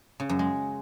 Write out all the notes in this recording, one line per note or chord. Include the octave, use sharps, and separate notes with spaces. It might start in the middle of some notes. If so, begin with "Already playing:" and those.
C#3
F#2
G#3